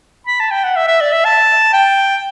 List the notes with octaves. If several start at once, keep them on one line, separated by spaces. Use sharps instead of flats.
B5
A5
G5
F#5
E5
E5
D5
E5
A5
G5